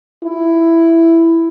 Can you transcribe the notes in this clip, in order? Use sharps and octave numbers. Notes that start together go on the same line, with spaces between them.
E4